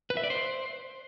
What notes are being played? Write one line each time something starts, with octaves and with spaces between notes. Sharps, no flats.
B4
E5
D5
C5